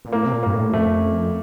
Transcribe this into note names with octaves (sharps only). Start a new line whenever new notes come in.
A#2
A2 A#3
C3
A#2
G2 A#3
A2
F2 A3